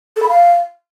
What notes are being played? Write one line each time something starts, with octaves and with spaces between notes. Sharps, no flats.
A4
B5
F5